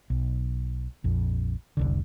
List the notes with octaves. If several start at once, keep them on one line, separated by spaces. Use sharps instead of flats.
B1
A#1 F2
F1 C2 D3